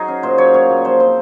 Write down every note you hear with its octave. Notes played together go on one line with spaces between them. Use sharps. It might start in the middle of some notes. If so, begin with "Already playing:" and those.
Already playing: F#3 D#4 F#4 G#4
C#4
A#2 C5
F#3 C#5
A#2 C#5
A#2
F3 C5
C4 C5